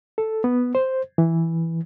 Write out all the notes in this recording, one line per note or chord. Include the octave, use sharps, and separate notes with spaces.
A4
B3
C5
E3